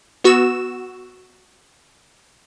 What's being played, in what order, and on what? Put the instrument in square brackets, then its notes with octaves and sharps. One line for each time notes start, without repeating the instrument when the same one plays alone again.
[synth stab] B3 F#4 E6 E7